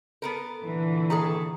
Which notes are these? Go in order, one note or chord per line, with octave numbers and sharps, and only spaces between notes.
B3 A4 A#4
A#2 D3 E3
D#3 G#4 A4 A#5 D#6